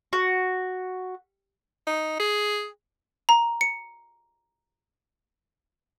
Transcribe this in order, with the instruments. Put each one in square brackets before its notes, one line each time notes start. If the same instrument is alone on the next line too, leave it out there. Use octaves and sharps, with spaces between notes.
[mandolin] F#4
[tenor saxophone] D#4
G#4
[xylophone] A#5
C#7